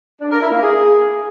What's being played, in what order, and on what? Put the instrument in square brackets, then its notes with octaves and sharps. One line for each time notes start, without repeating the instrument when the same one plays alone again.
[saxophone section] D4
A#4
E4
A#3
G#4